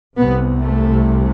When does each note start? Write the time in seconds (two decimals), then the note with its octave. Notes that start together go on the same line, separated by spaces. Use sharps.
0.16 C2 C3 B3
0.60 A3